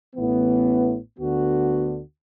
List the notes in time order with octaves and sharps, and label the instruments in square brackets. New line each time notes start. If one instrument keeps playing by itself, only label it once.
[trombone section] A1 A2 E3 B3
D2 D3 B3 F#4